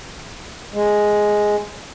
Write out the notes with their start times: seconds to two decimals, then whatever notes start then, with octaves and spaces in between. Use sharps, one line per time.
0.74 G#3